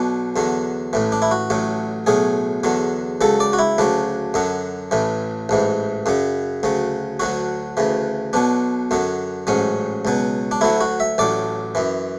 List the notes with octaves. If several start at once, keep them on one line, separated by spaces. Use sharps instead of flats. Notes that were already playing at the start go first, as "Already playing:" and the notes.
Already playing: B1 B2 F#3 D4
E2 D3 F#3
A1 A2 E3
D4
E4
F#4
A1 A2 F#3
B1 A2 F#3 G#4
E2 D3 F#3
C#2 C#3 F#3 A4
D5
F#4
E4
D2 C#3 F#3 D4
F#2 D3 F#3
A1 A2 E3
A1 G#2 E3
F#2 C#3 F#3
D2 C#3 F#3
D2 D3 F#3 F#4
D2 C#3 E3
B1 B2 F#3 D4
F#2 D3 F#3
A1 G#2 F#3 C#4
C#2 B2 F#3
D4
D2 D3 F#3 E4
F#4
E5
A1 A2 F#3 D5
F#2 E3